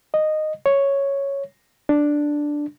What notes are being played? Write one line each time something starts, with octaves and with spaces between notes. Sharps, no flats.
D#5
C#5
D4